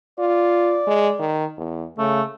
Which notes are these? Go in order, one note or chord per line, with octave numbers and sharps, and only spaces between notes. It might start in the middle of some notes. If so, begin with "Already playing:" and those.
F4 D5
G#3
D#3
E2
C#3 A3